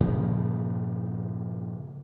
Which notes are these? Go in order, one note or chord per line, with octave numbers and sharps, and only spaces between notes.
G2 A#2 C#3 F3